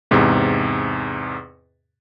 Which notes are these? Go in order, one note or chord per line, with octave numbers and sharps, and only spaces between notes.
E2 G#2 C3